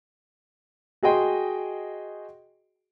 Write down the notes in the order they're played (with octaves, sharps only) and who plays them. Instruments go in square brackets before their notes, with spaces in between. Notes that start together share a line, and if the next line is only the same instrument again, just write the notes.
[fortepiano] F#4 G#4 D#5 G5 C6